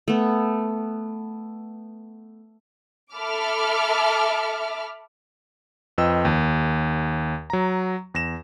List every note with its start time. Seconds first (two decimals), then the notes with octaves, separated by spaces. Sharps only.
0.08 A3 B3
3.14 A4 E5 B5 D6 F6
5.98 F2 F4 B4 D#5 G5 E6
6.25 D#2
7.50 F#3 A#5
8.14 E2 A#6 E7